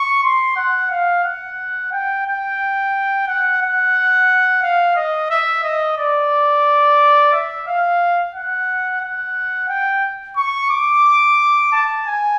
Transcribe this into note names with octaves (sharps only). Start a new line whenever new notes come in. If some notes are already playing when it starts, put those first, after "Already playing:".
Already playing: C#6
C6
F#5
F5
F#5
G5
G5
F#5
F#5
F5
D#5
E5
D#5
D5
E5
F5
F#5
F#5
G5
C#6
D6
A5
G#5